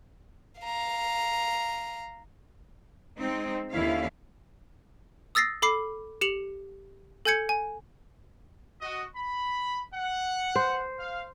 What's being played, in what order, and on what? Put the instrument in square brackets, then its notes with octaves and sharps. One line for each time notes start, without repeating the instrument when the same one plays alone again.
[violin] F5 A#5
[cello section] G#3 C4 D#4
D#2 D3 C#4 E4 F5
[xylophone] D#6 E6 A6 A#6 C7
A4 B5 D6 C7
G4 C#7 F7 F#7
A4 G#5 G6 G#6 C#7
G#5
[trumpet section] F#4 D#5
B5
F#5
[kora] C5
[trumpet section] F5